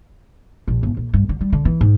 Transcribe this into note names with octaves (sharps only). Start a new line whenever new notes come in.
A#1
G1
A#1
G2
D3
G3
D3
E3
G#2